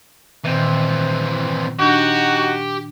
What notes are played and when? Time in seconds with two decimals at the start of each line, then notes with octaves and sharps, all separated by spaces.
0.44 A#2 D#3 E3 C4
1.79 D4 D#4 F#4 G4